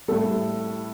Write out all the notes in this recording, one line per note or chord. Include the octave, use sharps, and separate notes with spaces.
A2 G3 A4